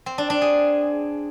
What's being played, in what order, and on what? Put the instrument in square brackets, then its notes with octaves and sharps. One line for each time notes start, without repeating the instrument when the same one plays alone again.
[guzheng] C4
D4
D4
G#4